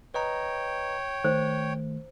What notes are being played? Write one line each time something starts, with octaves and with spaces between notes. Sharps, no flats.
B4 C#5 D#5 G5 A#5
D#3 A3 C5